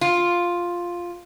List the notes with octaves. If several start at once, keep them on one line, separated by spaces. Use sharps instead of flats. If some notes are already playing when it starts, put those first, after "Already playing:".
F4